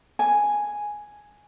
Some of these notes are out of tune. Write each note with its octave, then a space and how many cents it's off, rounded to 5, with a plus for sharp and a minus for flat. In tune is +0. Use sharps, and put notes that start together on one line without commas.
G#5 +0